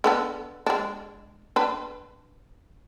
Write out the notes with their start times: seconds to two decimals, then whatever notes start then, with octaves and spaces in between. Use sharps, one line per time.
0.04 D3 B3 A4
0.66 G#3 D4
1.56 D4 B4